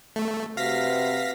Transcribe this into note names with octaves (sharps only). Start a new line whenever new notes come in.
A3
C3 F#4 B4 F5 A#6 B6